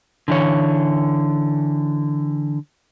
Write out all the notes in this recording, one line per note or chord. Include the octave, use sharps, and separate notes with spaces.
D3 E3 C#5